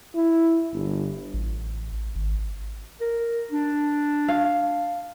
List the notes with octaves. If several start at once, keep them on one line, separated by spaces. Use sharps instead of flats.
E4
G1
A1
G#1
A#4
D4
F5